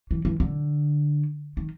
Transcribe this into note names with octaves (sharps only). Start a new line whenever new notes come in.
E3
E3
D3
D#3